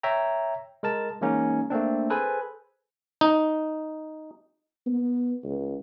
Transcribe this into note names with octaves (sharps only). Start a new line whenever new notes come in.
C#5 E5 G5 A#5
G#3 A#4 A5
E3 G#3 A#3 C#4 D#4
A3 A#3 C4 D4
G#4 A4 B4 C5 G#5
D#4
B3
C#2